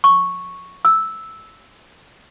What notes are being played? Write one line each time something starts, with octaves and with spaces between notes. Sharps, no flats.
C#6
E6